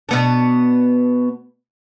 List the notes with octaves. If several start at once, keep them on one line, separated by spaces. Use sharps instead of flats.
B2 B3 D4